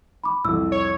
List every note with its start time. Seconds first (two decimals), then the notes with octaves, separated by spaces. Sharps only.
0.24 B5 D6
0.45 C2 F2 E6
0.72 C#5